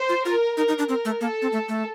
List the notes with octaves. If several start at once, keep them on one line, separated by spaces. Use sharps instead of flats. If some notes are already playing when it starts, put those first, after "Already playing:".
Already playing: C5
F4
F4 A#4
D#4 A#4
D#4
D4
C4 A#4
A3
A#3 A4
C4
A3
A3